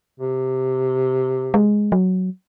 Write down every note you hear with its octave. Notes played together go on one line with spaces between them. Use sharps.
C3
G#3
F#3